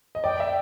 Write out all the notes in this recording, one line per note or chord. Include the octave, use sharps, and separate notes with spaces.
D#5
D5 G5
E5